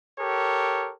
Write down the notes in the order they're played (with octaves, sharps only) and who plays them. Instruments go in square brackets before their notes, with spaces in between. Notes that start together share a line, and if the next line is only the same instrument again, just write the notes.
[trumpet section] G4 A4 A#4 C#5